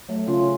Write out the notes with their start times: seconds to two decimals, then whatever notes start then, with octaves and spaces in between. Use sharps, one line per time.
0.09 F#3 A3
0.27 C#3 C#4 F4